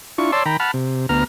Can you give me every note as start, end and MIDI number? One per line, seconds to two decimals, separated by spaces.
0.18 0.31 62
0.18 0.31 64
0.18 0.31 65
0.18 0.31 85
0.32 0.44 73
0.32 0.44 74
0.32 0.44 81
0.32 0.44 84
0.32 0.44 88
0.46 0.57 51
0.46 0.57 79
0.46 0.57 82
0.46 0.57 83
0.60 0.71 78
0.60 0.71 81
0.60 0.71 83
0.60 0.71 89
0.74 1.06 48
1.09 1.24 38
1.09 1.24 59
1.09 1.24 82
1.09 1.24 89